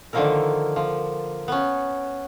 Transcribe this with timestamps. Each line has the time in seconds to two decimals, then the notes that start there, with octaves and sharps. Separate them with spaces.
0.13 D3 D#3 F3 A#3 E4 A#4
0.76 F3
1.48 B3 C#4